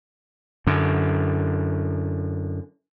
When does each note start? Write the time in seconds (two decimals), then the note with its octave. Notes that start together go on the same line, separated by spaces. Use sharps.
0.67 F#2 D3